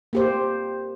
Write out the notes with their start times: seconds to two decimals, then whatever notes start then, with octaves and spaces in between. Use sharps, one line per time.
0.13 A#3 G4 C5